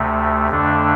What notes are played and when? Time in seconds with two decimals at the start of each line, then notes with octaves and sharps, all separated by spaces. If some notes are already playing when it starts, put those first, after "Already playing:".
Already playing: D2 C3 A3
0.48 F2 D3 A3 D4